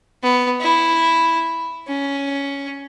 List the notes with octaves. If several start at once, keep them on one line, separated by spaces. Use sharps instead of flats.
B3
E4
C#4